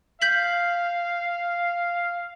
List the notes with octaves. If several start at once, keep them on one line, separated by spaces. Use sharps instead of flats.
F5 G6 B6 F#7